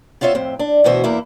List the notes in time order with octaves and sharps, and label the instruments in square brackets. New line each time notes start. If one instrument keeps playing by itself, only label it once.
[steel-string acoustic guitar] B3 C4 F4 C#5 E5
F2 A2 C4
D4
D2 B2 E3 F#4 C5 E5
E2 A#3 E4